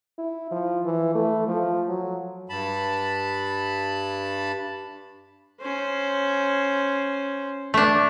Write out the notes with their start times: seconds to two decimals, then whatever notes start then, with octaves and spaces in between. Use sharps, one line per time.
0.18 E4
0.51 F3
0.86 E3
1.15 A3
1.47 F3
1.89 F#3
2.50 G2 A5 B5
5.61 C#4 C5
7.74 A3 D4